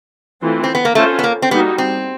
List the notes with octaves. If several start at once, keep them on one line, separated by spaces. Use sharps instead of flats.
E3 A3 C4 F4
C4
B3
A#3
A3 C#4 F4 A4 C5
B3
A#3
C4
G3 A#3 B3 D#4 F#4
C4